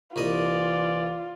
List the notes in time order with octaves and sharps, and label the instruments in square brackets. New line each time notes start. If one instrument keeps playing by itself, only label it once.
[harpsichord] C2 A#2 D#5 [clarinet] E3 [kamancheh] F4 [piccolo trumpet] D5